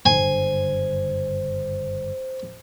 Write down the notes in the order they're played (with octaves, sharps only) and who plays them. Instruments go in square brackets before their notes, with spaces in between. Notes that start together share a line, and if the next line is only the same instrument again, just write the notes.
[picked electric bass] F#1 G2 D3 [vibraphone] C5 [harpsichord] G#5